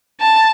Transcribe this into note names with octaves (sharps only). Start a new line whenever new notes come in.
A5